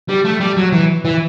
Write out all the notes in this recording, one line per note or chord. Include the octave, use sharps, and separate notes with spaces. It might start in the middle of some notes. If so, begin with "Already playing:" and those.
G3
A3
G3
F#3
E3
E3